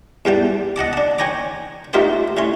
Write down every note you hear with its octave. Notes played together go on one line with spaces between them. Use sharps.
E2 G3 G5 A5
D#5 F#5 A5 D6
D4 A5
C#5 G5 G#5 A#5 D6
A3 D#4 F4 G4 C5 G5
A2 C#4 C6